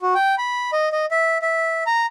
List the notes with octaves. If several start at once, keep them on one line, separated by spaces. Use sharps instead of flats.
F#4
G5
B5
D#5
D#5
E5
E5
A#5